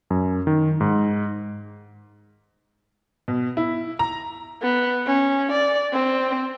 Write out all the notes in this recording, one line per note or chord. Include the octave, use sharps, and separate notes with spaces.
F#2
D#3
G#2
B2
E4
A#5
B3
C#4
D5
C4